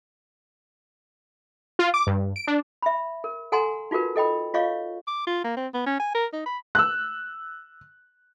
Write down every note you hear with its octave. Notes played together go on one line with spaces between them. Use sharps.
F4
D6
G2
D7
D4
E5 B5
A#4
A4 F#5 G#5 A#5 C6
D#4 F4 F#4 A#4 B4
A4 D#5 G5 B5
F4 C#5 D#5 F5 C#6
D6
F4
A#3
C4
B3
C#4
G#5
A#4
D#4
B5
E6 F#6